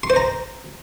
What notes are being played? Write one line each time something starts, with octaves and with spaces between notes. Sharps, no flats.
C6
C5
A#5